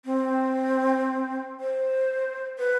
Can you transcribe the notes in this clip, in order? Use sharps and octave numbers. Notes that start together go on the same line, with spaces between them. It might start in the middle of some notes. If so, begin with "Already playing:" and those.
C4
C5
B4